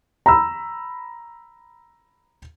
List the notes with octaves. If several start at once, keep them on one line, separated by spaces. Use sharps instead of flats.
A#5 B5 E6